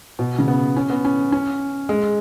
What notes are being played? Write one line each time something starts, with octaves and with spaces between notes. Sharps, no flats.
B2
C#3
B3
C#4
B3
C#4
C#4
G#3